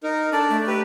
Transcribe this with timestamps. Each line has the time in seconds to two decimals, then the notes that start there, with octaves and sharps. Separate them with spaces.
0.03 D#4 A#4
0.32 D4 A4 D5
0.50 A3
0.67 G4 B4